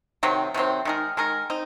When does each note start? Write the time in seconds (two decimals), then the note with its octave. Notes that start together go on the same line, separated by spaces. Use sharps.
0.23 C3 D#3 F#3 C4
0.54 C3 D#3 F#3 C4
0.85 D#3 G#3 D#4 A#4
1.17 D#3 G#3 D#4 A#4
1.50 C4 D#4